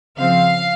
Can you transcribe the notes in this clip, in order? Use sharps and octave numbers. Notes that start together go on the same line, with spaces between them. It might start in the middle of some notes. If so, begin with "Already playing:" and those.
C#3 F3 C4 F5